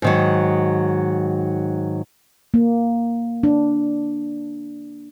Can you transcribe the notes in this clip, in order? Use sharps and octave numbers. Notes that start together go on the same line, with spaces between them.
G#2 D#3 F#3
A#3
D4